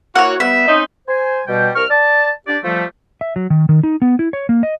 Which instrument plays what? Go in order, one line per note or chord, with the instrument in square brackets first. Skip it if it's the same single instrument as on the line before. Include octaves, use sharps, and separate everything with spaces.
[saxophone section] A#3 E4 F#4 [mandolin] C#5 F#5
[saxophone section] G3 B3 [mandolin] E5
[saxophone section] C4 C#4 D#4
[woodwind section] C5 G#5
B2 G3 G5
C2 A#4 C#6 F6
D5 A5
D4 G4 D5
F3 G3 A3
[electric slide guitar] E5
F#3
D#3
D#3
D#4
B3
E4
C#5
A#3
D#5